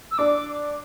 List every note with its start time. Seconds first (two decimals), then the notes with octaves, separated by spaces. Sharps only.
0.11 E6
0.18 D4 D6